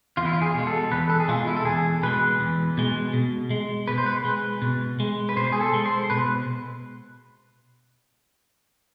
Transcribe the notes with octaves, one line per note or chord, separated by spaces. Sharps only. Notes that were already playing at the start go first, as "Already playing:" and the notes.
E2 F4
E4
F4
G#4
B2 G#3
A4
E2 B4
A4
G#4
B2 G#3 F4
E4
A4
E2 G#4
B2 G#3 B4
E2
B2 G#3
B2
G#3
B2 B4
C5
B4
G#3
B2
G#3
B4
B2 C5
G#4
A4
G#3
C5
B2 B4